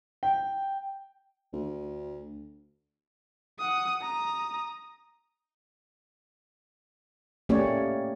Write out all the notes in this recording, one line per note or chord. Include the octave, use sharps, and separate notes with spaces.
G5
D2
F#5 D#6
A#5 D#6
A3 A#3 C#4 G4 C#5 D5